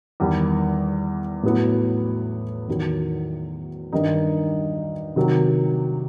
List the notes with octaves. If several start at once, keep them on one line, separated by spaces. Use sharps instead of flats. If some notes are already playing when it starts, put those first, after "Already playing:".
E2 D#3 G3
A2 F#3 B3 E4
E2 D#3 F#3
G2 D#3 G3 D#4
C3 D#3 F#3